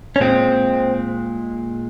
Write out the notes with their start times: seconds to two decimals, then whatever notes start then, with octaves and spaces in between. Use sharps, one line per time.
0.16 C#4
0.20 A#2 G#3 C4